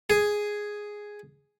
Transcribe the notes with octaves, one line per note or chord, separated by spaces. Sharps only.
G#4